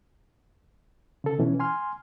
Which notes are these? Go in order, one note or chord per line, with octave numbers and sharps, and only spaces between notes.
C#3 A4
B2 E3 C#4
G#5 C6 F6